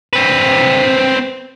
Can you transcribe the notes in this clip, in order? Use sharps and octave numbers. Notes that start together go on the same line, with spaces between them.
C4 B4